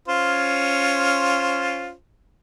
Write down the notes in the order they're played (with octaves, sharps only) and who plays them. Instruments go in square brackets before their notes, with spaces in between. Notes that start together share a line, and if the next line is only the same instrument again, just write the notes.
[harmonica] C#4 F4 C5